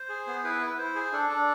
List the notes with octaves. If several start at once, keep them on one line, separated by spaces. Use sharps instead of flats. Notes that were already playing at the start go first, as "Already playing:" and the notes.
Already playing: C5
G#4
B3
E4 B4
E4
B4
E4 C5
G#4
D4 A4
D4